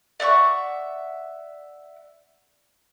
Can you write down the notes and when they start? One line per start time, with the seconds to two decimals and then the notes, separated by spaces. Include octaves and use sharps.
0.20 D5 E5 F#5 C#6